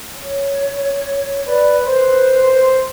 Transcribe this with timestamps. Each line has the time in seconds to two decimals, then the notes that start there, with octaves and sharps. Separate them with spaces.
0.15 C#5
1.47 B4 D5
1.86 B4 C5